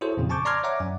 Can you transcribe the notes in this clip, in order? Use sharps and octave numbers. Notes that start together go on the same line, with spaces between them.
E4 F#4 G#4 A4 C5 C#5
F2 A#2 C#3
G#5 A5 C#6 D6 G6
D5 A#5 C6 D6 F6 G#6
C#5 D5 E5 F#5 A#5 D6
F#2 G#5